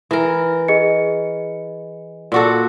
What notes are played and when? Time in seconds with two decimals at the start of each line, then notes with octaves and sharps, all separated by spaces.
0.11 E3 A#4
0.68 G#4 D#5 C#7
2.32 A#2 F#4 A4